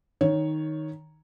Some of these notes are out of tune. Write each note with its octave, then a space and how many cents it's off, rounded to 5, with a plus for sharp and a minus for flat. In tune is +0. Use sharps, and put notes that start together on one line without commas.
D#3 +0 C#5 +0